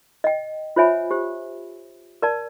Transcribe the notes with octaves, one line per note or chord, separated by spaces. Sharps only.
D#5 G5
F4 C5 C#5 E5 G#5 B5
G4 C5
A#4 D5 A5